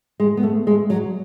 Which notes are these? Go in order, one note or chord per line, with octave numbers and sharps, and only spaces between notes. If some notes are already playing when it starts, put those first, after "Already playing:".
G#3
B3
A3
G#3
F#3